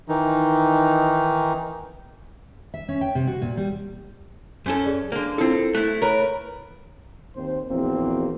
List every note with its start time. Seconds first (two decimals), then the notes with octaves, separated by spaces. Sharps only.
0.08 D#3 E3 D#4
2.74 E5
2.89 C#4
3.01 G5
3.15 C3
3.27 F#4
3.42 A#2
3.57 G3
4.66 F#2 C#4 A4
4.85 G#4 D5
5.12 D3 A#3
5.38 C4 E4 F4 A4 C7
5.75 A3 E4 F#6
6.02 A#4 B4 C#5
7.36 D#2 C4 C5
7.69 A#1 E2 A#3 C4 F#4